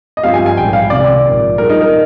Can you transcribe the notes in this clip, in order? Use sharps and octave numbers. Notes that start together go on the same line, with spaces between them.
D#5
G2 F3 C4 G4 F5
G#5
G#5
A#1 G#2 G3 G5
F5
C2 C3 D#3 D5
A#1 G#2 F3 A#3
A#2 G3 D4 G#4 A#4
D#4
A#4